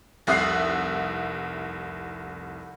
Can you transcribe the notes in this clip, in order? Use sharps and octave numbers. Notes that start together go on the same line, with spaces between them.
F1 C2 E5 D#6 F#6 C7